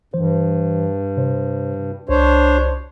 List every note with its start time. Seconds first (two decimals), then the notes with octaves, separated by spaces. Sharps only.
0.14 G2 E3 C5
1.17 C3 C5
2.09 C2 D4 C5 C#5